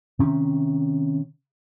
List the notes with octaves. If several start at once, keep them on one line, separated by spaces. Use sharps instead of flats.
C3 D#3 C#4